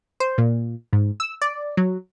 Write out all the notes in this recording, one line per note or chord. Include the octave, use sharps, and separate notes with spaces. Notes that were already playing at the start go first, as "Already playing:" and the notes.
C5
A#2
G#2
E6
D5
F#3